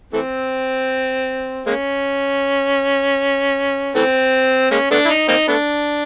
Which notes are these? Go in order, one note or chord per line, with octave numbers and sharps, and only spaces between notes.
E3 A3 C4
G#3 A#3 C#4
E3 A3 C4
G#3 A#3 C#4
A3 B3 D4
E4
D#4
A#3 C4 D#4
A3 B3 D4